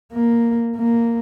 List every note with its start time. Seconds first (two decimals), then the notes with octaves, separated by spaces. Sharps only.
0.13 A#3
0.76 A#3